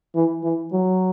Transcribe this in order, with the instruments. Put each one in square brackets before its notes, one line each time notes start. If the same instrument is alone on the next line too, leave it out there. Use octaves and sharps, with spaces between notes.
[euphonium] E3
E3
F#3